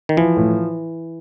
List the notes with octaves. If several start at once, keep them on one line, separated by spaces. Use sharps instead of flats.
D#3
E3 F3
A2